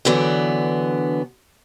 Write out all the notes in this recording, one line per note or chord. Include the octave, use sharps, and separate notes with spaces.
D3 E3 F#3 B3 D4